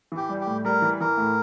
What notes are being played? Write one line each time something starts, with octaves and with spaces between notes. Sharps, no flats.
E3
G4
G3
G4
A2
G3 A#4
E3
E3 A#4
A2